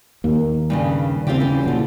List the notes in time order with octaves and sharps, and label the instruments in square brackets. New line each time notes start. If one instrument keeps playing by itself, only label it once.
[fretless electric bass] D#2 [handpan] A#3
[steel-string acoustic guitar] G2 A#2 C#3
[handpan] C#3 [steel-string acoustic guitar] C4 F4 G4
[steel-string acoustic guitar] E3 G3
[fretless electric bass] A#2 F#3 [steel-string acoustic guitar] D3 F3